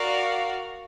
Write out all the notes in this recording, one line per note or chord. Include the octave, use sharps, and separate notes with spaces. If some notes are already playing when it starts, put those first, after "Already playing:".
Already playing: F#4 A#4 D5 F5